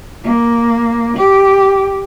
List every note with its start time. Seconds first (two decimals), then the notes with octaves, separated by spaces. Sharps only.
0.24 A#3
1.17 G4